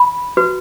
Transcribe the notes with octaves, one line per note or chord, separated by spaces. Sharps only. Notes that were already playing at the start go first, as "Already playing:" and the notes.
Already playing: B5
F#4 B4